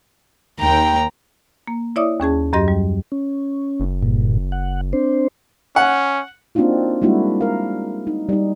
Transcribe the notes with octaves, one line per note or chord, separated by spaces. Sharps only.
D#2 G5 A#5
A#3
E4 C#5 D5 E5 D6 D#6
D#2 C#4 G#4 A5
F#2 F#3 G4 D#5 C6 A#6
G3
C#4
F#1
G2 A#2
F#5
C4 D4 C5
C#4 F#5
A#3 C4 D4 D#4 F4 F#4
G3 G#3 A#3 D4 E4 F#4
A#4 F5
D#4
G3 D#4